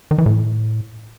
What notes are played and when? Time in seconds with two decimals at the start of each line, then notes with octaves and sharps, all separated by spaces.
0.11 D#3
0.18 E3
0.26 A2